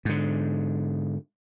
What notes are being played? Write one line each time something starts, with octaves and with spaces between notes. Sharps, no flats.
G#2 D3